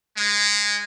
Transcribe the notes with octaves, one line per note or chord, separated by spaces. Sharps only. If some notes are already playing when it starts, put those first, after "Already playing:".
G#3